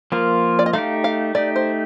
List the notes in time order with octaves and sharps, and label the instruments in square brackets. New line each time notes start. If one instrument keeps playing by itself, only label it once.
[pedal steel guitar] F3 A#3 F4 [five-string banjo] A#4
[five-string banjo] D5
D#5
[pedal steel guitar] A3 D#4 G4 [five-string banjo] F5
[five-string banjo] F5
[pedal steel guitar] A3 D#4 G4 [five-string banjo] D5
[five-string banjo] C5